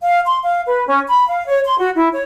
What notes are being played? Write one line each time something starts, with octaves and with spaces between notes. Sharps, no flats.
F5
C6
F5
B4
C#4
B5
F5
C#5
C6
F#4
E4
C#5